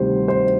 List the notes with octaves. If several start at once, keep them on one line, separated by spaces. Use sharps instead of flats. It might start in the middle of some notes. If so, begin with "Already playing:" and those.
Already playing: D2 C3 D#3 G3 C5
C5